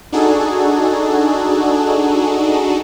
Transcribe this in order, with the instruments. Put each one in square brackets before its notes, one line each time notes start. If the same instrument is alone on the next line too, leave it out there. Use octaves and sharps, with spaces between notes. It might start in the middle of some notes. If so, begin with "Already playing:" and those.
[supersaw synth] D4 D#4 F#4 G#4 A4